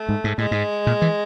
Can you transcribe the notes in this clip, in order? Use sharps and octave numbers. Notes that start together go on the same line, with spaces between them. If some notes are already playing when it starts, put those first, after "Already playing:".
Already playing: A3
G#2
G#2
A2 G#3
G#2
A#2
E3